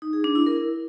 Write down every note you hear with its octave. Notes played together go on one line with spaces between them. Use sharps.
D#4
G#4
D4
E4
A#4